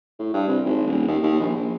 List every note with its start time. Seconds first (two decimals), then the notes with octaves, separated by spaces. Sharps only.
0.19 A2
0.34 G2
0.48 C2
0.66 G#1
0.87 D#1
1.08 D#2
1.23 D#2
1.40 A#1
1.56 A#1